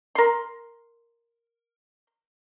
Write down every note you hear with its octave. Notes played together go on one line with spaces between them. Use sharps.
A#4 C6